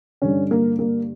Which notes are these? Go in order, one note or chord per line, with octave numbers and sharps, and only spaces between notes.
G2 D3 C#4
A#3
A#3